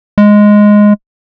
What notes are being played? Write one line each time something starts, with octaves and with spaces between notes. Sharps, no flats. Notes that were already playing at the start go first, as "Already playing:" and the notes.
G#3